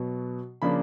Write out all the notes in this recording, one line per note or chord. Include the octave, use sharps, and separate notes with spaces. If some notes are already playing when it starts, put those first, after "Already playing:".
Already playing: B2 F#3 B3
C#3 F3 A#3 D4 B5